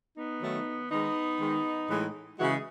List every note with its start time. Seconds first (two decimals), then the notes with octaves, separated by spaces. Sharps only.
0.17 B3 D#4
0.41 D#3 F#3 A3
0.91 D#3 G#3 B3 D#4
1.40 D#3 G#3
1.89 A2 E3 G#3
2.39 C#3 E3 G#3 F#4
2.50 G#4